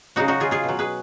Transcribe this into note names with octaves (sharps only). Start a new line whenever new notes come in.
C#3 F#3 D#4 F#4
D#4 F#4
F4 G#4
F4 G#4
B2 F#3
G#4 B4